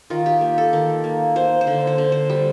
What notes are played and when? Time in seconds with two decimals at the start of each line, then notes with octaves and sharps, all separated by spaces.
0.10 D#3 F4
0.26 G4
0.41 A#3
0.58 A4
0.73 D#3
1.04 A#3
1.36 A#3 C5
1.61 C5
1.67 D3
1.87 C5
1.98 D3
2.12 C5
2.30 G3